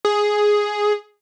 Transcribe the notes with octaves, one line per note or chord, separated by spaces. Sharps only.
G#4